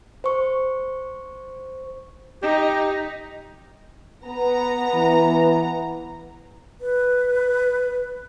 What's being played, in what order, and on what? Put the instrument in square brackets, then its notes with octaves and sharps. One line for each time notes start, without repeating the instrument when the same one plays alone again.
[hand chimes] C5 C#6
[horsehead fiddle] D#4 [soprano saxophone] G4
[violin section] B3 A#5
[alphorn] E3
[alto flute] B4